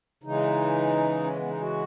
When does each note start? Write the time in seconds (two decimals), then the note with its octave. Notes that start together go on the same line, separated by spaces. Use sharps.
0.23 C#3 E3 G#3 D#4
1.24 C#4
1.36 B3
1.48 D#4
1.61 F#4